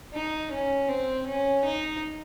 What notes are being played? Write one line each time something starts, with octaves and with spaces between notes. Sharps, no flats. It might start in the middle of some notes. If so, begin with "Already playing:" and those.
D#4
C#4
C4
C#4
D#4